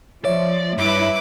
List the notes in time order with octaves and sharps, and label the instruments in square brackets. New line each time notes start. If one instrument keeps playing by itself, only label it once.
[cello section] F3 [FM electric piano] C#5 E5 [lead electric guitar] D5
[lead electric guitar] G2 [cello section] E4 [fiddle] B4 D6